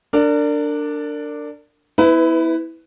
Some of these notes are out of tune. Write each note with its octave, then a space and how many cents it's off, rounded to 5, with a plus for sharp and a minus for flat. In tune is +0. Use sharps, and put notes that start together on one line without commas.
D4 +0 A#4 -35 D5 +0
B3 +0 E4 -15 B4 +20